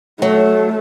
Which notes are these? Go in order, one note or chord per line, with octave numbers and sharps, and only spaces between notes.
F#3 A3